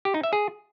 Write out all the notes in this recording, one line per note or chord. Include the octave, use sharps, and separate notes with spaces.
G4
D#4
E5
G#4